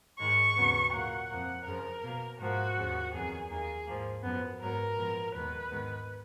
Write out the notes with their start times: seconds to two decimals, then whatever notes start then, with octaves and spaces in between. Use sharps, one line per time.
0.20 G#2 D#3 G#3 C#6
0.56 D#2 C#3 F#3 B3
0.93 A#2 F#3 A#3 F#5
1.30 F2 F3 A#3
1.66 F#2 C#3 F3 A#4
2.03 B2 A#3
2.40 G#2 F3 A#3 F#4
2.77 D#2 C#3 F3
3.13 F2 D#3 F#3 B3 G#4
3.50 D#2 D#3 A#3 G#4
3.87 G#2 F3 A#3
4.23 F#2 F3 B3
4.61 G#2 F#3 B3 A#4
4.97 A#2 F3 G#3 B3
5.34 D#2 D#3 G#3 B3 B4
5.71 G#2 D#3 G#3 B3